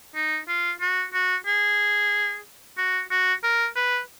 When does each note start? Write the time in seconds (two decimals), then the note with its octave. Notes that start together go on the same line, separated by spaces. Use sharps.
0.15 D#4
0.48 F4
0.81 F#4
1.13 F#4
1.46 G#4
2.78 F#4
3.11 F#4
3.44 A#4
3.76 B4